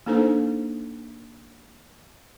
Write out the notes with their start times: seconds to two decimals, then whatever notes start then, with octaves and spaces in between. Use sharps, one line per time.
0.06 A#3 D4 D#4 A4 C5